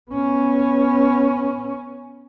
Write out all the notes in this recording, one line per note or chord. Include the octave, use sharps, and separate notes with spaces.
B3 C#4